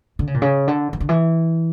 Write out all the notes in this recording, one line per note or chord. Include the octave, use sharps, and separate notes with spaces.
D3
C#3
A#2
C#3
D3
E3
D3
E3